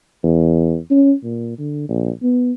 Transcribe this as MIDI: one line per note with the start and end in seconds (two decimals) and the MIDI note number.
0.23 0.78 40
0.91 1.13 61
1.23 1.56 46
1.58 1.87 50
1.89 2.11 34
2.23 2.52 59